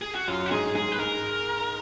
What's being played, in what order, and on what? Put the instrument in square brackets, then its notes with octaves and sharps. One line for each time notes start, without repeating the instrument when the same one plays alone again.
[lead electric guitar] G#4
F#4
[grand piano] F#2 F#3 [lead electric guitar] F4
[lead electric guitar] F#4
[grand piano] G#2 G#3 [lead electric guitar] G#4
[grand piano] G#2 G#3 [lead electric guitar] G#4
[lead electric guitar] B4
[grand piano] G#2 G#3 [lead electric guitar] A#4